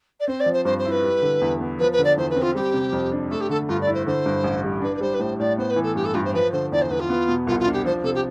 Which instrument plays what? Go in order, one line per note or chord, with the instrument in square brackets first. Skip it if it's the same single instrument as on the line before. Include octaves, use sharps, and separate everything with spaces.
[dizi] D5
[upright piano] C4 [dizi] C5
[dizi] D5
[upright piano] F3
[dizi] C5
[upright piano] G2 [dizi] C5
[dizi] C5
[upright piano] E4
[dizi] B4
[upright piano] G3
D3
E2
B3
[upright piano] F3 [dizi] B4
[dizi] B4
[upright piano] D3
[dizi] D5
[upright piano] E2 [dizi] C5
[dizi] B4
[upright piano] C4
[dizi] F4
[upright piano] G3 [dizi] G4
[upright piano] C3
F2
D4
[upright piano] A3 [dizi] A4
[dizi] G4
[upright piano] D3 [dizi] A4
[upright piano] G2 [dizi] F4
[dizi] D5
[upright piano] E4
[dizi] C5
[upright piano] D3 [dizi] C5
[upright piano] G2
A1
G3
[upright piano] D4 [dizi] B4
[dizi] B4
[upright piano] G3 [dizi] C5
[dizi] B4
[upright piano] A2 [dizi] C5
[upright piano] A2 [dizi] D5
[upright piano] B3 [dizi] C5
[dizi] B4
[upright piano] E3
[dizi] A4
[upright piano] G2 [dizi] G4
[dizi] A4
[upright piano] G2 [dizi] F4
[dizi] C5
[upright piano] F3 [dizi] B4
[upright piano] D3 [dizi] C5
[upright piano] E2 [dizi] D5
[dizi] C5
[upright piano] E2 [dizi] B4
[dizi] F4
[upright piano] B3
B2
[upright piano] C2 [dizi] F4
[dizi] F4
[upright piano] D4
[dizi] G4
[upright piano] F3 [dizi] C5
[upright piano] C3 [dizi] A4
[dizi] G4